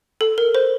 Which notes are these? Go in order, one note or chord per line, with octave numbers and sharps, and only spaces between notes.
A4
A#4
C5